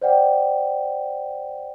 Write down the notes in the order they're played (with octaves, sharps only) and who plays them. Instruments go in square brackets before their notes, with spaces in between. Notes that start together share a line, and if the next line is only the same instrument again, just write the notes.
[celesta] C5 D5 F#5 G5